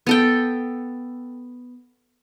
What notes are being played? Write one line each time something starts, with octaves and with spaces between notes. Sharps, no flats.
B3 A4 G5